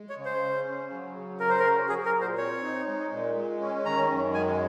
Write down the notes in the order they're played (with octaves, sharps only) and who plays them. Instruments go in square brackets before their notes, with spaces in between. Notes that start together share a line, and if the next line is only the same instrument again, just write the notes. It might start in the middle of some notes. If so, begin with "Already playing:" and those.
Already playing: [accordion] G#3
[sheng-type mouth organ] C#5
[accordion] C#3
[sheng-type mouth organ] C5
[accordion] C#4
C#3
F#3
C#3
[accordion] C#4 [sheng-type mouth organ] A#4
[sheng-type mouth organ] C5
A#4
[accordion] F#4
[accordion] F#3 [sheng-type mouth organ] G#4
[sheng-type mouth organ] A#4
[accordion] A#2
[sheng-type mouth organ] C5
[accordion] C4 [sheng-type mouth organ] C#5
[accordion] D#4
G#3
A#2
G#3
C#4
[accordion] D#3 [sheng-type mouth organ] A#5
[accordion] F#2
[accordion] G#3 [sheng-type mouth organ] G#5